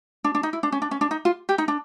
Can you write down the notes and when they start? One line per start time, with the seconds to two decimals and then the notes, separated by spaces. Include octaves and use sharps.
0.24 D4
0.35 D4
0.43 D#4
0.53 E4
0.63 D4
0.72 C#4
0.82 D4
0.91 C#4
1.01 D4
1.11 D#4
1.25 F4
1.49 G4
1.58 D#4
1.68 D4